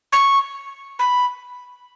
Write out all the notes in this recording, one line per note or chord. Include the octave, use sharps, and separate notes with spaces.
C#6
B5